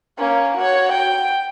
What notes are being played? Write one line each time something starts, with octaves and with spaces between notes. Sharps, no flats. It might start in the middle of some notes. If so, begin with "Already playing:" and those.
A#3 C#4
F#4 C#5
G5